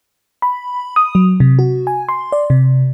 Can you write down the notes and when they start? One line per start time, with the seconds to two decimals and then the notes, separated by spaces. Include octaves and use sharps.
0.42 B5
0.96 D#6
1.15 F#3
1.40 C3
1.59 F#4
1.87 G#5
2.09 C6
2.32 D5
2.50 C3